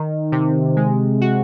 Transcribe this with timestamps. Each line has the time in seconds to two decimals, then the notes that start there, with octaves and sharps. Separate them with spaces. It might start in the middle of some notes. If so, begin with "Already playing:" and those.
Already playing: D#3
0.32 C3
0.76 G#3
1.21 F#4